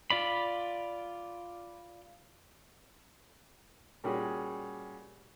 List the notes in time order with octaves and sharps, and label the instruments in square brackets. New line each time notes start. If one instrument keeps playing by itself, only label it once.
[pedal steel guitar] F4 D5 B5
[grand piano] A#2 G3 C#4 F#4 G#4